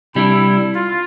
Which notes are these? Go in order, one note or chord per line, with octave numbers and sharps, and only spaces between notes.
C3 G3 D4 E4
F4